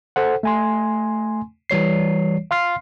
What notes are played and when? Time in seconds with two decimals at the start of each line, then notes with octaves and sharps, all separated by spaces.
0.16 A4 C5 F#5
0.43 A3 G#5 C6
1.70 E3 G3 C#5 C7
2.51 F5 C6 F6 C7